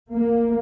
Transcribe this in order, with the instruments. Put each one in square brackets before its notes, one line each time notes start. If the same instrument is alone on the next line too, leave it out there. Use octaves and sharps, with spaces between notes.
[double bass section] A#3